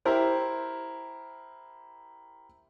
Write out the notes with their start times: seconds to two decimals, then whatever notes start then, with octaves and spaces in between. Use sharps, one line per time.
0.05 E4 G4 A#4 C5